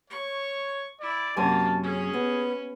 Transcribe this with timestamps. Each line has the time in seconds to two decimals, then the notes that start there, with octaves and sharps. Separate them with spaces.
0.10 C#5 C#6
1.01 E4 D5
1.36 F#2 C3 A#3 G#5 A5
1.83 C#4 G#4
2.13 B3